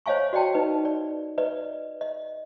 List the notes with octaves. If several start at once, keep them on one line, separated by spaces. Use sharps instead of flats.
C5 C#5 D#5 F5 G#5 C#6
F#4 D5 D#5 G5 A5
D#4 B4 D#5
D5
B4 D5 D#5
D#5